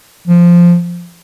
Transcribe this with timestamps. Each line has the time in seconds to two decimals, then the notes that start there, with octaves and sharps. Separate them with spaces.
0.28 F3